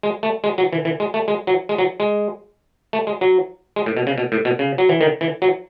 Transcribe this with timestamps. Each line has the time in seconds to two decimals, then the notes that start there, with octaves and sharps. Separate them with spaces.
0.03 G#3
0.23 A3
0.44 G#3
0.58 F#3
0.73 E3
0.85 E3
1.00 G#3
1.14 A3
1.28 G#3
1.47 F#3
1.69 G#3
1.78 F#3
2.00 G#3
2.93 A3
3.07 G#3
3.21 F#3
3.76 G#3
3.86 A2
3.97 B2
4.07 C#3
4.18 B2
4.32 A2
4.45 B2
4.59 C#3
4.78 F#3
4.89 E3
5.01 D#3
5.21 E3
5.42 F#3